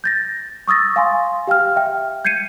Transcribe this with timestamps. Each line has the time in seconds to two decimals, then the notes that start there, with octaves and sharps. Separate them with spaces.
0.04 G6 A6 A#6
0.68 C#6 D#6 E6 A6 A#6
0.96 F5 G#5 C6
1.47 G4 F5 G5 F6
1.76 E5 G5
2.25 G6 G#6 C7 C#7 D#7